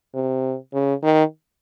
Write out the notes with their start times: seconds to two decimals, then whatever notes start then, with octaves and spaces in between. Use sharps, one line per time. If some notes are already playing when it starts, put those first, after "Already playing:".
0.14 C3
0.74 C#3
1.03 D#3